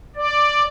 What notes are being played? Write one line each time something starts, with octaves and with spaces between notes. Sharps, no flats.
D5